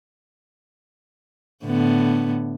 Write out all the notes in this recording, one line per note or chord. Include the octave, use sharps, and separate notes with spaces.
A2 D3 B3